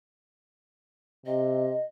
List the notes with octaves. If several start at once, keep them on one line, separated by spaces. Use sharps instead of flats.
C3 D#5